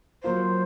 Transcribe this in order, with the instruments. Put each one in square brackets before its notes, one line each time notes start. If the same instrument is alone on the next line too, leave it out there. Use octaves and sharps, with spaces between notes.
[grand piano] F#3 A#3 F4 [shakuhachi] C5